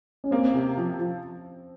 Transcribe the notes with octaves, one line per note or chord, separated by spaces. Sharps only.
C#4
A#3 C4
C3
F3
F3